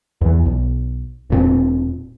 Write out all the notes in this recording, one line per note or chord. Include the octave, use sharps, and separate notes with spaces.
E2 E3
B1
E1 A#2 C4